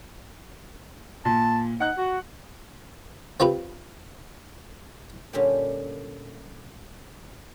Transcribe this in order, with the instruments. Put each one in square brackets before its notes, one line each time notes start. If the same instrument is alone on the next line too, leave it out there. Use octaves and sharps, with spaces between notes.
[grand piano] A#2 [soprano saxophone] A5
[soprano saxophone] D#4 [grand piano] F#5 F#6
[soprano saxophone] F#4
[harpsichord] C4 F4 G4 B4
[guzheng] A#2 D3 G3 C#4 G4 D5